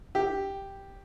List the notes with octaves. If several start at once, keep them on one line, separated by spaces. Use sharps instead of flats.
G4